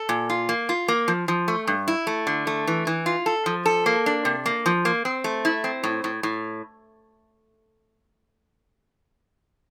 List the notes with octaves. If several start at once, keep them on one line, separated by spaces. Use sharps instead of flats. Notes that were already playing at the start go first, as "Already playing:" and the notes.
Already playing: A4
A#2
F4
A#3
F4
A#3
F3
F3
A3
G2
E4
A3
D3
A3
E3
E3
F4
A4
F3
A4
A#3
D4
C3
A#3
F3
A#3
C4
A3
E4
C4
A2
A2
A2